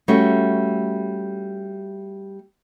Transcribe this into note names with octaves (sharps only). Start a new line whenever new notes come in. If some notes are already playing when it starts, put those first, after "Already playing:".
G3 A3 C#4 F#4